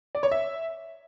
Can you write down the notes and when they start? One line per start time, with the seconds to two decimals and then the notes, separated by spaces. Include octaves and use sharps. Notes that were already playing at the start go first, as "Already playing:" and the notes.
0.15 D5
0.23 C#5
0.32 E5